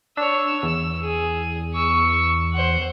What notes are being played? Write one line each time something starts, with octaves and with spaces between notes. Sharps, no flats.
D4 C#5 E6
E2 E6
G#4
C#6 E6
C5 F#5